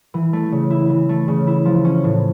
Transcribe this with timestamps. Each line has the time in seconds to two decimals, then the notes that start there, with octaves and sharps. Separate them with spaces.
0.14 E3
0.33 A3
0.52 C#3
0.70 E4
0.90 E3
1.09 A3
1.28 C#3
1.47 E4
1.65 F3
1.85 C#4
2.04 A2